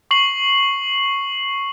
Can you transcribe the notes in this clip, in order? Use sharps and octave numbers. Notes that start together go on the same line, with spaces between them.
C#6 C7 F#7